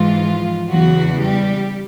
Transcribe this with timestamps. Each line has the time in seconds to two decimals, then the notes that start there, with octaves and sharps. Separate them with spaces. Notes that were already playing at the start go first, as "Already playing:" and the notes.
Already playing: G#2 E3 F3 F4
0.70 E2 C#3 E3 F#3 F#4
1.21 G3 G4